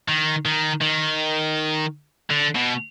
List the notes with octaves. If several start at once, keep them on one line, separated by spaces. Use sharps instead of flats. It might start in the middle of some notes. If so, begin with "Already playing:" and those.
D#3
D#3
D#3
D3
B2